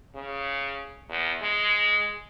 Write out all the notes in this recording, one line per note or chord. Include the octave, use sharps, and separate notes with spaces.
C#3
E2
G#3